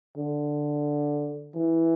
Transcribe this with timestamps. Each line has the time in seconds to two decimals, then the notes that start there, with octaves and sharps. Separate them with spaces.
0.17 D3
1.55 E3